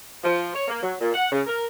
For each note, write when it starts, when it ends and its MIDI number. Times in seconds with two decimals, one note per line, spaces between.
0.24 0.50 53
0.54 0.67 73
0.68 0.82 58
0.83 0.94 54
1.00 1.13 46
1.14 1.30 78
1.31 1.41 49
1.47 1.65 70